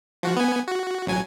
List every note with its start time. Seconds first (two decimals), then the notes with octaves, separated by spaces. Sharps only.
0.23 F3 F#4
0.37 B3 G#5
0.68 F#4
1.07 A1 F#3 G#5